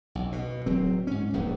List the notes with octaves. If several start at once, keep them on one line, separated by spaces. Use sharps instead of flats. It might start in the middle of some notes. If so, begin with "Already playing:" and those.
B1
B2
D1 F#3 C4
G#2 C#4
D1 A#1 D#2 G#2